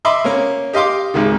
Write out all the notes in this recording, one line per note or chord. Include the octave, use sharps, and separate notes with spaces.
D#5 E5 B5 C6 D6
A#3 C#4 A#4
G4 D#5 F5 C6 D6
G#1 C#2 D#3